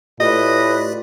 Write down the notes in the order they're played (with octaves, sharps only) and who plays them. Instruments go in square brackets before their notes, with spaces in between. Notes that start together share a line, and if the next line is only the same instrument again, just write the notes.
[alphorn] A2 [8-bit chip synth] F4 G4 D5 [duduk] B4 [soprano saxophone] D#5